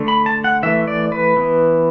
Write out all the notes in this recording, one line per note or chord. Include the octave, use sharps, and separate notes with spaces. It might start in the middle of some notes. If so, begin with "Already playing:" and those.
Already playing: D3 A3
B5
A5
F#5
E3 A3 E5
D5
B4
E3 B3